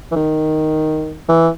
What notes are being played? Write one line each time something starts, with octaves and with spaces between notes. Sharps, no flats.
E3
D#3
E3